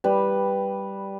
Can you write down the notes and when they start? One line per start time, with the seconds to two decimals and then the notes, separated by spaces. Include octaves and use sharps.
0.04 G3 B4